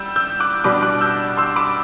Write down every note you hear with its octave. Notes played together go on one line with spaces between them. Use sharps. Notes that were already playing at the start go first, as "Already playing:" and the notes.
Already playing: G3 E6 G6
E6 G6
D6 F#6
B2 G3 D4 B5 D6
D6 F#6
E6 G6
C6 E6
B5 D6